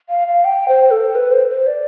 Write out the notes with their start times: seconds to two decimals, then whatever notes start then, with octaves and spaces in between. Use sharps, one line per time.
0.09 F5
0.28 F5
0.45 G5
0.69 C5
0.91 A4
1.15 B4
1.32 C5
1.50 C5
1.67 D5